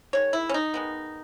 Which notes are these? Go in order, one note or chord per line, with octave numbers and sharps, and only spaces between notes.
D#3 G#3 C#5
E4
C#4
D#4
D#3 G#3 B3